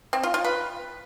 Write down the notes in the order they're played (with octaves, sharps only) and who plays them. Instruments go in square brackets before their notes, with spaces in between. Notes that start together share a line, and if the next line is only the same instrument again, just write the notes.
[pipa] C4
F4
F4
B4